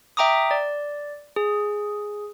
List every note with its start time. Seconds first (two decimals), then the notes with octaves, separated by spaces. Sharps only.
0.17 E5 G5 A#5 D6 D#6
0.51 D5
1.36 G#4